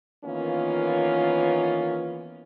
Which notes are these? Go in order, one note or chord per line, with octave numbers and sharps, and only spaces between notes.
D#3 E3 A#3 B3 C#4 F4